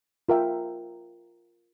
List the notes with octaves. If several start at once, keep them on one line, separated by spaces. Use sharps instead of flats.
F4 A#4 E5 G5